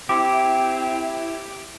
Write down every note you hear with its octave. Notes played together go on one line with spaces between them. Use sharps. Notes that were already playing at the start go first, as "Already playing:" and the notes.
C4 E4 G4 G5 C6 D6